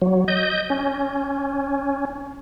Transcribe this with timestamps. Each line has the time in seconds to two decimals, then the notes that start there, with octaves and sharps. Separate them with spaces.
0.02 F#3
0.28 D#5 G6
0.70 C#4